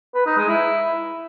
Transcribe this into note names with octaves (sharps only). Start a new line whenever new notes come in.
B4
D#4
G#3
E4